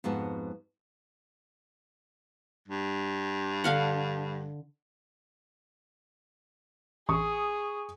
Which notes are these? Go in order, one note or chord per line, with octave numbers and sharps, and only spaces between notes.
F2 G#2 G#3 B3 F#4 A5
G2
D3 F5 F#5
A1 G#4 C#6 D#6